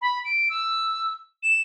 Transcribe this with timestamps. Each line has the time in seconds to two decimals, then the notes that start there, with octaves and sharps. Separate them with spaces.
0.02 B5
0.25 D7
0.50 E6
1.43 E7